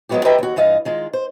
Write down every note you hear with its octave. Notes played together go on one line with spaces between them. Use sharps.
F3 F#3 G#3 B3 F#4 G4
G4 A#4 B4 D#5 E5 G5
D#2 F#4
G2 E3 F4 D#5 F5
D#3 G#3 F4
C5